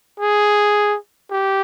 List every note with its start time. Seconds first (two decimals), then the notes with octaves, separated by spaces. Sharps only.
0.20 G#4
1.31 G4